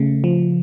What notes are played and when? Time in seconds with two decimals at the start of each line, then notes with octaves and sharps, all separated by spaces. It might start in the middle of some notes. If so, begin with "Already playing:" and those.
Already playing: C#3 A3
0.24 F3